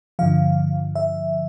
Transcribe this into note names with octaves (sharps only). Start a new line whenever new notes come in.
G2 D3 F3 F5
E5